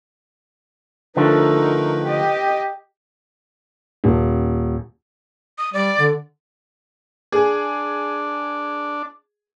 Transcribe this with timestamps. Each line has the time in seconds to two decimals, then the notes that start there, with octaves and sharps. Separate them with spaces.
1.17 D3 F3 A3 D#4 A#4 B4
2.04 G4 D#5
4.04 D#1
5.58 D#6
5.73 G3 D5
5.98 D3
7.32 D4 G#4